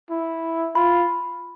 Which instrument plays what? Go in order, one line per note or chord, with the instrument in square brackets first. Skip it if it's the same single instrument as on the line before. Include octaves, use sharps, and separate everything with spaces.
[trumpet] E4
[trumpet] F4 [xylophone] B5